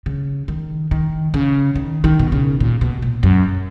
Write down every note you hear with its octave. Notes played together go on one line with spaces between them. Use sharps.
C#3
D#3
D#3
C#3
D#3
D#3
B2
C#3
A#2
B2
A#2
F#2